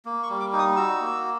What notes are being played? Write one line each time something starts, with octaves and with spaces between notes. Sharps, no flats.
A#3
C#6
G3
D6
D#4
D#6
F#4 E6
A#3